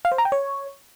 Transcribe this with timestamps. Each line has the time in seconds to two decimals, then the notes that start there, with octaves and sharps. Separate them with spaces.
0.05 F5
0.12 C5
0.18 A#5
0.25 G5
0.32 C#5